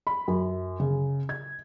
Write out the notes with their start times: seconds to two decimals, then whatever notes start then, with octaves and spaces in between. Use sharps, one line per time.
0.07 B5
0.28 F#2
0.80 C#3
1.29 G#6